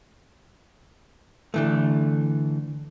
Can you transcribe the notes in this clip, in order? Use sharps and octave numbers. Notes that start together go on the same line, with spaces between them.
D3 E3 A3